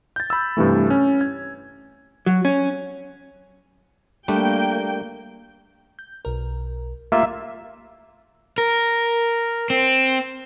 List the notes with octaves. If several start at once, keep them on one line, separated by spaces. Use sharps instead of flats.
G6 A6
B5 E6
G2 C3 E3 A3
C#4
G#6
F#3
C#4
G3 A3 A#3 D4 G5
G6
B1 A#4
A3 A#3 F4 G4 E5
A#4
C4